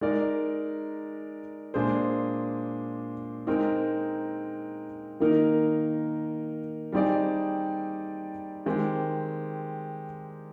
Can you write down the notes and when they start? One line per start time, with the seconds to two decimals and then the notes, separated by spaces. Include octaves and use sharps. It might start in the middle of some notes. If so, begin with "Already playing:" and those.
0.01 G#3 D#4 A#4 D5
1.74 A#2 G#3 D4 G#4 C5
3.47 G#3 C4 D#4 A#4
5.20 D#3 A#3 D#4 A#4
6.92 G3 C4 D#4 G#4 D5
8.66 D#3 G#3 C4 G4